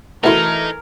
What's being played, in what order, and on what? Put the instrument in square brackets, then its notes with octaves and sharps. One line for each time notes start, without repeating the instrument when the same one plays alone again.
[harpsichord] B2 E4 C6 [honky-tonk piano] E3 A3 [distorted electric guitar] D#4 [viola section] A#4